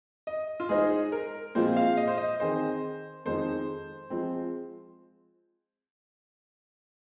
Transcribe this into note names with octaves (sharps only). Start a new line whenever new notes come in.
D#5
F4
G#3 D#4 G#4 C5 D#5
A#4
A#2 F3 G#3 C4 F4 C5
F5
D#5
C5
D#5
D#3 C4 G#4 C5 D#5
F2 D#3 G#3 D#4 C5
F3 G#3 C4